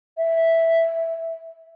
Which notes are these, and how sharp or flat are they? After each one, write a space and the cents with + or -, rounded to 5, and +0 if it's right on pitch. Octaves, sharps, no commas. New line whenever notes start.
E5 +0